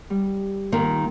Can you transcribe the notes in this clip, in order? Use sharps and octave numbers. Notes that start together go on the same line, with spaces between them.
G3
A#2 D#3 A#3